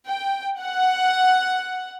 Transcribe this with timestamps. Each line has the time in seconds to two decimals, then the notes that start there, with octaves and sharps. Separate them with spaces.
0.10 G5
0.60 F#5